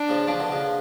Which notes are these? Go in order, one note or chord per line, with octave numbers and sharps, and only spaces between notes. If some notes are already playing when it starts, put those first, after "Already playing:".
Already playing: D4
C#3 F3
C#3 F3
B2 D3
C#3 F3